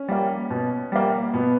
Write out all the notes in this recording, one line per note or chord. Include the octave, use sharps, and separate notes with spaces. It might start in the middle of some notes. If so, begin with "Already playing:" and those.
Already playing: C#4
G3 A#3
B2
G3 A#3
B2 B3